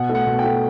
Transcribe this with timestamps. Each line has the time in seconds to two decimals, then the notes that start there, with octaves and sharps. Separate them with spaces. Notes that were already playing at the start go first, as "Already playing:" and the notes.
Already playing: B2 F#5
0.09 A3
0.15 F#5
0.26 B2
0.39 G5
0.44 A3